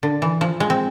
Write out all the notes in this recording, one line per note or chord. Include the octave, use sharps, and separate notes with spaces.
D3
E3
F3
G#3
C4